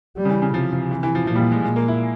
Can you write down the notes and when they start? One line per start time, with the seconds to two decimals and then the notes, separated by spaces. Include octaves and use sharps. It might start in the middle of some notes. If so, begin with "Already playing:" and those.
0.17 G3
0.25 C#3
0.30 E3
0.42 C#3
0.54 C3 F3
0.73 F3
0.91 E3
1.03 E3
1.15 F3
1.27 A#2 F3
1.36 G3
1.40 F3
1.52 G#3
1.64 A#2 G#3
1.76 A#3
1.88 E4